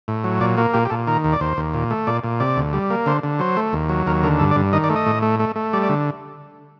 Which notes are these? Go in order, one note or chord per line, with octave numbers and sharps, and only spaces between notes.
A2
F#3
A#2 D5
A#3 F#4
A#2 G4
G4
A#2 A4
D#3 A#4
D#2
D5
D#2 C5
D#2
A#2
A3
A#2 D5
A#2
C3 D5
D2
G3
A#3
D3 C5
D3
F#3 C5
A3
D#2
F#3
D#2 A#4
D3 A#4
G2 A4
D5
G2
D#3 D#5
D5
A3
D#5
A2
A3
A3
A3
G3 D5
D5
D3